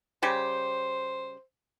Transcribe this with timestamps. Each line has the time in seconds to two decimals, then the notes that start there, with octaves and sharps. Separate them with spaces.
0.23 C#3 G3 G4 C5